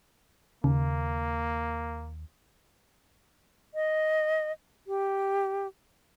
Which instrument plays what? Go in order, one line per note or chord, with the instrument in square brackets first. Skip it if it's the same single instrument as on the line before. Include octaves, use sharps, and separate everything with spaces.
[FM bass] D#2 [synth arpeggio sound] C#3 [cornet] A#3
[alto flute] D#5
G4